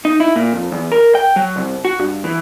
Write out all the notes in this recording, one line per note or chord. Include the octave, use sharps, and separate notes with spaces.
D#4
E4
A#2
F2
E2
A#4
G5
F#3
C2
F#4
G2
E3